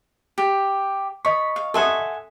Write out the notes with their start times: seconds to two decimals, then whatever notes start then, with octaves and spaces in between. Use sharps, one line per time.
0.38 G4
1.25 D#5 B5 C#6
1.56 F5
1.74 A4 E5 F#5 G#5 C6 D#6